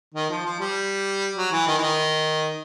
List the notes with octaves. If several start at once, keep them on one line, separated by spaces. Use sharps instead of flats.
D#3
F3
F3
G3
F#3
E3
D#3
E3
D#3